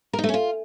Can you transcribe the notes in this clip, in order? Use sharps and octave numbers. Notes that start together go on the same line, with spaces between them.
A#4
D#4
A3
C#4
F4